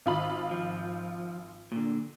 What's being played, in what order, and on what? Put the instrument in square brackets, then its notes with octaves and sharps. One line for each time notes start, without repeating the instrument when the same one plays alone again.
[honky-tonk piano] G#1 F4 B5
[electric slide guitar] F3
A#2 D3